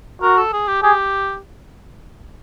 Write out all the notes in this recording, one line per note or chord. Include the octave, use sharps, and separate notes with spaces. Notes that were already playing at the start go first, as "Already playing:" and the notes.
F#4 A#4
A4
G#4
G4
G4 G#4